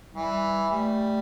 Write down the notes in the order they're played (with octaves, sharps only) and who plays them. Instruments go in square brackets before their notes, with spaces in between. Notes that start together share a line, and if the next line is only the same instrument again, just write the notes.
[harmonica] E3 [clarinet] G3
[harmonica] G3 [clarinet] A3